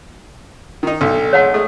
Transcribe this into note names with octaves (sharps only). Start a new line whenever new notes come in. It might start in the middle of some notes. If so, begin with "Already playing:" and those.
D#3 D#4
B1 D3
G#3 C#5 F#5 A5
G#3 A3 D#6